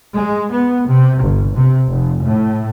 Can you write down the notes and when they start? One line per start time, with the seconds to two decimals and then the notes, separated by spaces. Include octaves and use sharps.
0.16 G#3
0.52 B3
0.89 C3
1.24 G1
1.55 C3
1.90 F1
2.24 A2